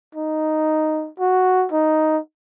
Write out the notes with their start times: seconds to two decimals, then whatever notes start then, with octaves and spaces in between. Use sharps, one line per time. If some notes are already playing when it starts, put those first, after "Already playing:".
0.15 D#4
1.19 F#4
1.72 D#4